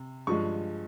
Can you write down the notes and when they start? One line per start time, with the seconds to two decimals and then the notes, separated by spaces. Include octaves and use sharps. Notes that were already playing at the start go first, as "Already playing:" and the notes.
Already playing: C3
0.27 G2 F3 G#3 C#6